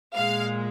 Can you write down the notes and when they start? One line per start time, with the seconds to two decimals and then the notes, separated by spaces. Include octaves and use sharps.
0.15 A#2 G#3 F5